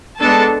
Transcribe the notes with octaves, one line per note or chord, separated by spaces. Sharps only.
G#3 B3 D4 A4 A5